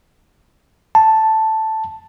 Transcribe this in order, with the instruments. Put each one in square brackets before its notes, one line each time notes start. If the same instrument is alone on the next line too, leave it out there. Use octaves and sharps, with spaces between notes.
[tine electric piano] A5